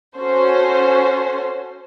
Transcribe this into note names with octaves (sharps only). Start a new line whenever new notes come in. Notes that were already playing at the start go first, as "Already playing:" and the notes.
C#4 F#4 A4 C5 C#5